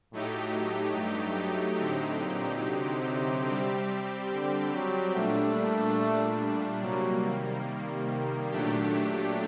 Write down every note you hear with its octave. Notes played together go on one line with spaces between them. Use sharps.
A2 F#3 A3 D#4 G4
G2
A2 D3 F#3 C4 D#4 G4
A#2
C3
G3 C4 G4
D3
F#3
A#2 G3 A3 D4
C3 F#3 G3 A#3
D#3
A#2 F#3 A3 D4 G4